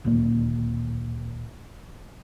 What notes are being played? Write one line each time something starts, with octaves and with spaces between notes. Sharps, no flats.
D1 D#2 A#2 A#3